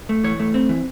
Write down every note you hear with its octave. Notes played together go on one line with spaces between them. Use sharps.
A3
E3 C#5
A3
C4
E3